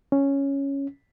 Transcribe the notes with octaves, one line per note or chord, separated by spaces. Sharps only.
C#4